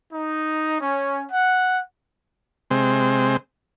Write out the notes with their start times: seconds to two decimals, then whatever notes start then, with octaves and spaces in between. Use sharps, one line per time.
0.13 D#4
0.81 C#4
1.32 F#5
2.71 C3 G#3 C4